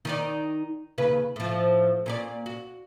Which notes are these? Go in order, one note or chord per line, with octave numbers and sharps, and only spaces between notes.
D#3 D#4 D5
D#2 C#3 B4
A2 F3
A#2 C#4 D5
F#4